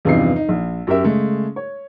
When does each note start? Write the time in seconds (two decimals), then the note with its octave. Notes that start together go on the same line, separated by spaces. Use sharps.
0.05 E2 G2 C3 F3 D#4 C7
0.36 D#4
0.49 A#1
0.87 F#2 G4 A#4 E5
1.04 C#3 G#3 A3
1.56 C#5